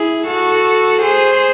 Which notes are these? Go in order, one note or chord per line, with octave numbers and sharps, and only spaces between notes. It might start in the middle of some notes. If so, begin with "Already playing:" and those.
Already playing: E4 G#4
F#4 A4
G#4 C5